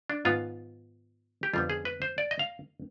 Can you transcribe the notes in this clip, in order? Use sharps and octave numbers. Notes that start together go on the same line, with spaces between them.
D4
G#2 D#3 B3 F4
G4
F2 D3 G3 B3 F4
G#4
B4
C5
D5
D#5
F5